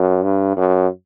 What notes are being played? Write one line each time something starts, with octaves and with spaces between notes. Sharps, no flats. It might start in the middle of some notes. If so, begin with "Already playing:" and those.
Already playing: F#2
G2
F#2